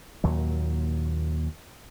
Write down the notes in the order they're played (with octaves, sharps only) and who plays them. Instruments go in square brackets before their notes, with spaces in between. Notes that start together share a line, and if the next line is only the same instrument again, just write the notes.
[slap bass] D#2 A#2 F#3